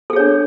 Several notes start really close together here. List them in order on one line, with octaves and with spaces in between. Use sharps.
A4 G#4 C#5 D4